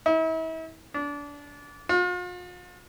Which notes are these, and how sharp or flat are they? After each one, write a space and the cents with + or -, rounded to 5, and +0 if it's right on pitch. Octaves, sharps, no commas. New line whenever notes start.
E4 -40
D4 -25
F4 +45